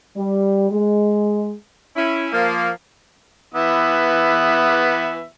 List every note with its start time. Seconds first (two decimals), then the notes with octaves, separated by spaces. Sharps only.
0.16 G3
0.70 G#3
1.96 C#4 E4
2.33 F3 A#3
3.54 E3 B3 E5